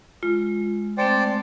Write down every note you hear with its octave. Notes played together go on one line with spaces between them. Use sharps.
G#3 F4
G#3 A3 C4 C5 D5 G5